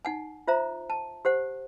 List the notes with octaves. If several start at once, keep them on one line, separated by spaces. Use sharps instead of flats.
D#4 F#5 G#5
F4 C5 E5 A#5
A5
G4 C5 F#5